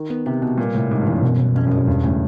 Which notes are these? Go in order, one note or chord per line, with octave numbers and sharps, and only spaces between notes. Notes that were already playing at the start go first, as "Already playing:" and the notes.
Already playing: D#3
B3
C3 B3
B2 B3
A#2 G3
A2 C3
G#2 G3
G2
E3
F#2
B2
B2
F2 C#4
F#2
G#3
F#2
E2 G2
A2 C#3